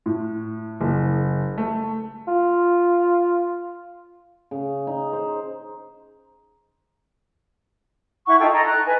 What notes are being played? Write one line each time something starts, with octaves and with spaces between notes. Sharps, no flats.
A2
F#1
A3
F4
C#3
D#4
C5
E4 F#5 C#6
D#4 F4 A4 G5
A4 D#5 A#5
A#5 F#6
B4 G#5